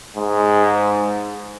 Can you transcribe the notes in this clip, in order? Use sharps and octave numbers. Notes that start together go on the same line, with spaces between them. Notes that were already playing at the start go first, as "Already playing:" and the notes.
G#2